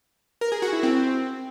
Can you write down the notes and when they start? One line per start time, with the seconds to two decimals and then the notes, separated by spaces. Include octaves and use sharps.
0.41 A#4
0.52 G#4
0.62 F#4
0.73 E4
0.83 C4